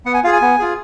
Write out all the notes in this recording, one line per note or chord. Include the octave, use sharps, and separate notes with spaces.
B3 F#5
G#5
F4 G#4 F5
G#5
B3
F4 G#4